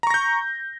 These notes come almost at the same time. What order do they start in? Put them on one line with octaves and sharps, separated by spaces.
A#5 C#6 A#6 G6